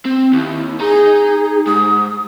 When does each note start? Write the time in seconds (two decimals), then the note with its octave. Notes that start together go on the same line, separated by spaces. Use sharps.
0.06 C4
0.33 D#2 E4
0.80 D#4 G#4 A#5
1.67 G#2 D#6